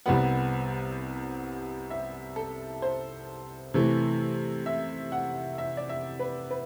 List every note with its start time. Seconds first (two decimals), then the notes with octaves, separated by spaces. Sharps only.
0.06 C2 C3 G3 B3 F#5
1.90 E5
2.36 A4
2.82 C5
3.74 C3 E3 A3
4.66 E5
5.12 F#5
5.58 E5
5.77 D5
5.89 E5
6.20 B4
6.51 B4